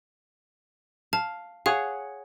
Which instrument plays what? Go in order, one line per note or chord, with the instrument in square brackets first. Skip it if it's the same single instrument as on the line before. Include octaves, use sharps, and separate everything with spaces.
[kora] F5 [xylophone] A5
[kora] G#4 C#5 F#5 [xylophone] F5